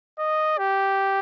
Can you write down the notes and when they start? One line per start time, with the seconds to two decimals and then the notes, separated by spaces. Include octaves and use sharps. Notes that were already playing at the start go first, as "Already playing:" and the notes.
0.19 D#5
0.58 G4